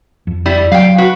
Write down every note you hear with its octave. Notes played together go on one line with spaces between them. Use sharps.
F2
G3 E4
F#3 F5 G5
F#4 B4